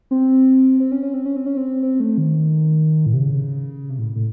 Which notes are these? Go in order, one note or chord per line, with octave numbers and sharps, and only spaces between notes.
C4
C4
C#4
C#4
C4
C#4
C4
C#4
C4
C4
A3
D#3
A2
C3
C#3
C3
A2
A2